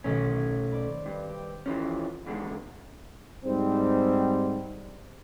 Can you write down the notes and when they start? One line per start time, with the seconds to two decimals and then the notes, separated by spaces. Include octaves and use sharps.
0.04 B1 B2 D#3 A3 C#4
0.72 C5 D5 B5
1.06 G2
1.29 G4
1.66 E3 F3 C#4
2.26 E2 D3 G#3
3.45 G#2 G3 C4